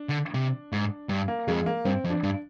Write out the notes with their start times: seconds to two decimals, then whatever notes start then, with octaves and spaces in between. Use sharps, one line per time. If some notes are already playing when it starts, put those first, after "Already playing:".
Already playing: D4
0.09 D3
0.34 C3
0.72 G#2
1.09 G2
1.28 A#3
1.48 F2 G#3
1.66 A#3
1.85 G2 C4
2.04 F2
2.10 D4
2.23 G2